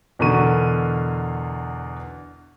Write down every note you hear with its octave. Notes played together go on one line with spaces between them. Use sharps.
E2 B2 D3 A#4 C#6 D#7